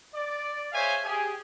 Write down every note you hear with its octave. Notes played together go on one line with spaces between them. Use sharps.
D5
G#4 C5 C#5 E5 F5 G#5
G4 G#4 G#5